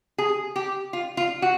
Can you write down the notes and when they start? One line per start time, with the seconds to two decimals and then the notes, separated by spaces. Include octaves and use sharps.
0.18 G#4
0.56 G4
0.93 F4
1.17 F4
1.42 F#4